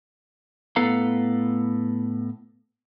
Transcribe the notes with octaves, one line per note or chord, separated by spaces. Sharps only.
A2 B3 A4 B4 F5 A#5